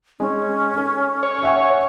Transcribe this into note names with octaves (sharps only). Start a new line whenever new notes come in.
G#3 C#4
A4
C#5
E5 F#5 G#5